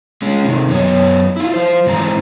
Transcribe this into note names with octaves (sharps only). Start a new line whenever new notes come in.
G#3 C#4
C3 D#3
F#2 B3 C#5
E4 F4
F3 C5
G#2 E3 C4 A#5